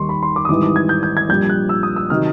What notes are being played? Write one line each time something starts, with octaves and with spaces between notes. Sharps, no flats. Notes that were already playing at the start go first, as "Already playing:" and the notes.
Already playing: D#2 D#3 G3 C6 C#6
B5
C6
D6
D#6
G#1 G#2 E3 G3 D6
D6
G#6
G6
G6
G#6
A#1 A#2 G3 G6
F#6
E6
D#6
E6
C3 D#3 F#3 F6